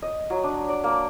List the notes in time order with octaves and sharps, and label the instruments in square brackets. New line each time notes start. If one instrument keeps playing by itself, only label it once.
[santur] D#5
F#3
D4
D5
A#3